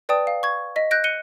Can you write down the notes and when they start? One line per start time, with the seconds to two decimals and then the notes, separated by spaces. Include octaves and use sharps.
0.09 B4 D5 G5 A5 D#6
0.27 F5
0.43 C#6 G#6
0.76 D#5 B6
0.91 F#6 G6 A#6 D7
1.04 F#6 C#7 D#7 G7